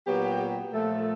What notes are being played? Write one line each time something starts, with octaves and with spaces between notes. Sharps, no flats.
A#2 F#3 B3 G4
A#2 F3 A3